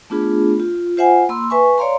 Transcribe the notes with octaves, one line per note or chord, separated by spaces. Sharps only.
A3 B3 D4 F4 G#4 B5
F4
F4 C5 E5 F#5 G#5
A#3 B5 C6 E6
B4 E5 G#5 C#6
C#5 D5 F5 A#5 C6